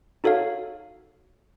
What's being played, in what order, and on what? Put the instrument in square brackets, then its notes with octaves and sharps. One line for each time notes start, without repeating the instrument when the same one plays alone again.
[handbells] D#4 F#4 A4 C#5 F5